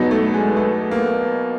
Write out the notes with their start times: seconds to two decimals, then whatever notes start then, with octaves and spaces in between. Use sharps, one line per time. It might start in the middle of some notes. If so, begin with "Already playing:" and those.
Already playing: E2 B2 F#3 B3 D#4
0.11 A3
0.34 G#3
0.57 A3
0.91 A#3